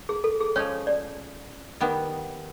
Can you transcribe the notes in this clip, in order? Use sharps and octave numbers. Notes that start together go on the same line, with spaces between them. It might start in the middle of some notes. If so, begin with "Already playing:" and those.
G#4
A4
G#4
F3 G#3 C#4 C#5
D5
D#3 G3 B3